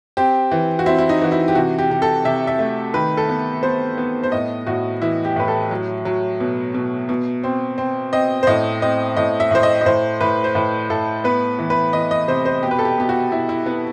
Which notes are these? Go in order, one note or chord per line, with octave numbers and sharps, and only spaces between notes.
C4 G4
E3
F#4
C4 E4
E4
D#4
E3 F#4
E4
G4
C3 F#4
G4
C3 G4
A4
C3 E5
E5
A3
D#3 B4
A4
B3
B3 C5
B3
C5
A2 D#5
A2 F#4
E3 E4
G4
A2 B4
A4
F#3
F#3
B2
B2
B2
C4
C4
C4 D#5
C5
A2 D#5
C4 D#5
A2 D#5
E5
A2 C5
D#5
D#5
A2 C5
A2 B4
C5
A2 B4
A2 A4
B3 B4
E3
B4
E3 D#5
D#5
C3 C5
C5
B2 G4
B4
A4
G4
B2 G4
F#4
B2 E4
E4
B3